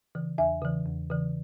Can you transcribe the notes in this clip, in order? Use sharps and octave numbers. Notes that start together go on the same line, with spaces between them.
C#3 E3
E2 E5 G#5
C#3 E3
E2
C#3 E3